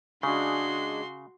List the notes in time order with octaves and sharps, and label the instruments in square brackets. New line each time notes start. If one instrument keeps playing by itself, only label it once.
[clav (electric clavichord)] C#3 [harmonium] G#3 D4 G#4 [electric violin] F#4 C6